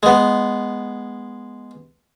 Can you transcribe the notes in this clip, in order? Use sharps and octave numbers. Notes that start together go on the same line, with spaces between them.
G#3 B3